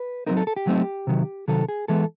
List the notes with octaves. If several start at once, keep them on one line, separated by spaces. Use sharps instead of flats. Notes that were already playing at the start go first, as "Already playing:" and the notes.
Already playing: B4
F#3 A3 C4 D#4 A#4
A4
A4
G4
F#3 A3 C4 D#4
C3 D#3 F#3
C3 D#3 F#3 A4
G#4
E3 G#3 B3 A4